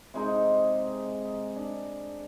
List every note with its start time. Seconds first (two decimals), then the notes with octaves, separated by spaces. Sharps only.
0.14 C3 G#3 D#4
1.56 D4